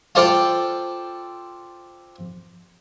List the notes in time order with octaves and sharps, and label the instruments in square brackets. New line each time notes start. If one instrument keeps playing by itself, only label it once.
[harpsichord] F4 A4 C5 D5 F5 G5